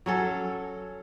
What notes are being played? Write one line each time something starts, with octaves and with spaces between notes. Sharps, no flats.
F#3 C#4 A4